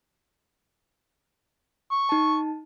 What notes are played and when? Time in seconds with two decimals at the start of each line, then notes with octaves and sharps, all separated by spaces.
1.92 C#6
2.09 D#4 A5